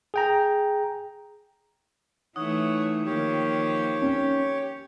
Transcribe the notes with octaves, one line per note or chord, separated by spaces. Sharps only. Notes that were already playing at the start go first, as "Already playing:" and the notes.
G#4 G5 A#5
E3 A3 D#4 C#5 F#5
D#3 F3 A#3 G4 C#5
C#4